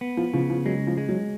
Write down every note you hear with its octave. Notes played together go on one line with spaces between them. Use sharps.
B3
F3
C#3 F3
F3
F#3 G#3
F3
G#3
F#3